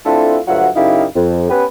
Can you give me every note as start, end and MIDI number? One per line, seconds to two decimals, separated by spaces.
0.05 0.38 57
0.05 0.38 60
0.05 0.38 62
0.05 0.38 64
0.05 0.38 65
0.05 0.38 69
0.48 0.67 38
0.48 0.67 43
0.48 0.67 54
0.48 0.67 65
0.48 0.67 76
0.48 0.67 78
0.76 1.04 42
0.76 1.04 49
0.76 1.04 63
0.76 1.04 64
0.76 1.04 67
0.76 1.04 77
1.15 1.47 41
1.50 1.64 59
1.50 1.64 61
1.50 1.64 67
1.50 1.64 71